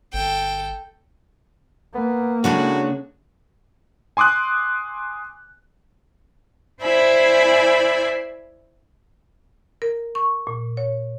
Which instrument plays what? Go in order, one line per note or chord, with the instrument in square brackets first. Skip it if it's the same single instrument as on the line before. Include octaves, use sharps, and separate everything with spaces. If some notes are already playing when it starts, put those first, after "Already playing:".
[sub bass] G1 [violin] A4 G5
[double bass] A#3 [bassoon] B3
[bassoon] A2 [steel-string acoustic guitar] C#3 G#3 D4 [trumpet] F#4
[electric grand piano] G#5 C6 D6 D#6 F#6
[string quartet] E4 C5 D5 E5 G#5 B5
[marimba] A#4
C#6
A#2
C#5